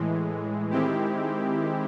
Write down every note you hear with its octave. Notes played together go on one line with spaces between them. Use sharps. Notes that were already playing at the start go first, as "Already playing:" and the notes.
Already playing: A2 E3 G#3
D#3 G#3 C4 E4 G4